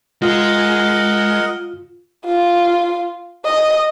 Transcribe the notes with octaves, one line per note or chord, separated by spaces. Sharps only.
G#3 F4 A#4 D#5 F#5
F4
D#5